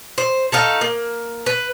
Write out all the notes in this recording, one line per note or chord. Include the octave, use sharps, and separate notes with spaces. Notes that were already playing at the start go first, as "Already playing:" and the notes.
C5
A3 D#4 F5
A#3
B4